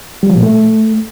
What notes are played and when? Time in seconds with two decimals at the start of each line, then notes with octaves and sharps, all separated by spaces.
0.23 G3
0.30 F3
0.36 A#2
0.43 A3